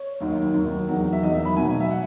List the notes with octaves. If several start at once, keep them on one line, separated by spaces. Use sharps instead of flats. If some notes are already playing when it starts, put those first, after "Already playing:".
Already playing: C#5
D#2 D#3 F#3
D#2 D#3 F#3
E2 D#3 F#3
E5
E2 D#3 F#3 D#5
E5
B5
B1 B2 F#3 G#5
E5
F#5